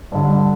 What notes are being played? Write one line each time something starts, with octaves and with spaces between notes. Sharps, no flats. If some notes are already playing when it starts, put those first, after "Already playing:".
G2 D3